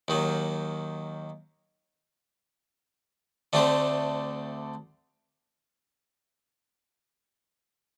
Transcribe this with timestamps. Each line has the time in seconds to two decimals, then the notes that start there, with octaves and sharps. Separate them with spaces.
0.08 D#2 D#3 F#3
3.53 D2 D3 A3 C4 G4